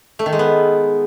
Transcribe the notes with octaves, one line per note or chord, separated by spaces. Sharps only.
A3
D#3
G#3
B3